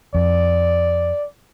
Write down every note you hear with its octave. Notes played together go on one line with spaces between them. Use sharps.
F2 D5